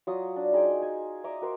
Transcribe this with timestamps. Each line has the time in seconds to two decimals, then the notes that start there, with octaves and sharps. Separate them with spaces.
0.07 F#3 F4 D#6
0.36 D4
0.53 D#4 G#4 C5 G5
0.82 G#5
1.24 D#5 E5 A#5 D6
1.42 F#4 A#4 C5